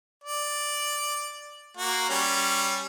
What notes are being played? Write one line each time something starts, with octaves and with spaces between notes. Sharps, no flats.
D5
A#3 F#4
G3 C#4